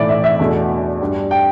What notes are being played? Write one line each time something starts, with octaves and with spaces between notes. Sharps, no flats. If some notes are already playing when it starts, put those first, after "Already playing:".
Already playing: B1 A2 E3 A3 E4 D5
E5
E5
E2 B2 A3 D4
G2 G3 D4
G5